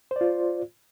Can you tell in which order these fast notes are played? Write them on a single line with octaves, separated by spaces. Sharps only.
C5 D5 F4